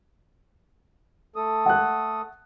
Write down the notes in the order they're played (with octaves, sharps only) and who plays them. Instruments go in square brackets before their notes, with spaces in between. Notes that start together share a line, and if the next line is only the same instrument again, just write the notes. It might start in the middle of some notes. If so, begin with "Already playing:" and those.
[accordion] A3 A4 D#6
[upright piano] F#5 F#6